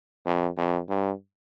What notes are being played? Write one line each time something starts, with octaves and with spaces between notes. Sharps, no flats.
F2
F2
G2